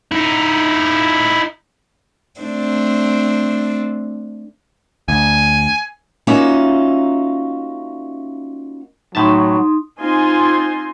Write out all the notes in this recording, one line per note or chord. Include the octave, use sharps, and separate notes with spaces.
D#4 E4
A3 C4 D4
D2 G#5
A#3 C#4 D#4 F4 F#4 E5
A2 F#3 D#4 E5 A5 C6 D#6
C4 D#4 F4 G#5 C6